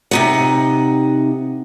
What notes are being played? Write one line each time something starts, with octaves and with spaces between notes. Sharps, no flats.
C3 D#4 F#5